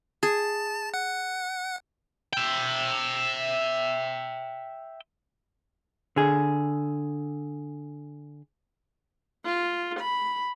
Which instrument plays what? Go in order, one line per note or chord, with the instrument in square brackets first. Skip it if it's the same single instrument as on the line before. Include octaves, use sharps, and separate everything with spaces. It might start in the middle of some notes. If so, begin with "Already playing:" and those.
[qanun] G#4 [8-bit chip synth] A5
[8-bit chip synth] F#5
[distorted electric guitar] E5 G5
[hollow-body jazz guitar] D3 G#4
[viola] F4
B5